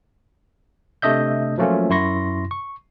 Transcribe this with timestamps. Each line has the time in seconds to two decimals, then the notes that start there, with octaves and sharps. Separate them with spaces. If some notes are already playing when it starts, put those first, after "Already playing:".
1.02 C3 A3 D4 D#5 E5 G6
1.58 F3 F#3 A3 A#3 C#4 F4
1.90 F#2 E4 C6 C#6 A#6
2.51 C#6